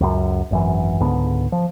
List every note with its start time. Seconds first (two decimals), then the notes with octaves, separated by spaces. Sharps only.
0.01 C#2 F#2
0.51 G#1 F#2 E3
1.00 C#2 G#2 D3 B3
1.52 F3